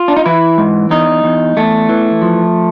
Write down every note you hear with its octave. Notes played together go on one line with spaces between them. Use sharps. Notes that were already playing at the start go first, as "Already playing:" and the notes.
Already playing: F4
D4
D#4
E3 E4
G#2
E2 D#4
E2
E2 A3
E3
F3